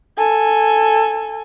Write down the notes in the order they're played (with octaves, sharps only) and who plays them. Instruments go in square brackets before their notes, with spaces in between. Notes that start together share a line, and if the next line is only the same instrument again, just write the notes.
[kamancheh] A4 G#5